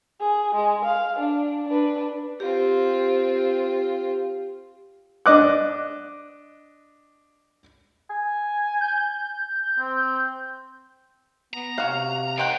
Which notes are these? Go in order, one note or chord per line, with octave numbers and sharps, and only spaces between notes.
G#4
G#3
F5
D4
D4 B4
C4 F4 G4
D4 D#5 D6 F#6
G#5
G6
C4
B3 A#5
C3 C#4 F#4 F5 F#5
A2 D#3 C4 F#5 G5